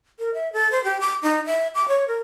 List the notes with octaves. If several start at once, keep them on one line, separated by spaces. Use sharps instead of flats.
A#4
E5
A4
C5
G4
D6
D#4
E5
D6
C#5
A#4